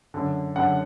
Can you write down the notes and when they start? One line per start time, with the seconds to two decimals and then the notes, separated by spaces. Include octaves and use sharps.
0.14 F#2 D3
0.56 F#2 D3 F#5